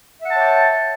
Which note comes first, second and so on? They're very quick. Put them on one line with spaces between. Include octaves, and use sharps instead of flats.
E5 F#5 A5 C#5 G5